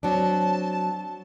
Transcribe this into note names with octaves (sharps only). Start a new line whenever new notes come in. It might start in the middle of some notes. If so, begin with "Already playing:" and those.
F#3 C4 D4 A5